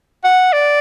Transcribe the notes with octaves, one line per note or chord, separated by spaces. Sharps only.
F#5
D5